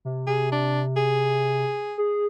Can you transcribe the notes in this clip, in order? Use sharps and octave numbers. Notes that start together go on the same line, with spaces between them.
C3
C3 G#4
D4
G#4
G#4